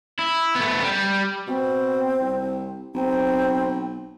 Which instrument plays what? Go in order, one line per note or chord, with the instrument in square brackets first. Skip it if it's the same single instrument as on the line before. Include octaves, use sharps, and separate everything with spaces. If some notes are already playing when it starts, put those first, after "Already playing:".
[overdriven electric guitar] E4
A3 B3
G3
[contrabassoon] B2 [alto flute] C4
[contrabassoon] C2
[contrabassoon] B1 [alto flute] C4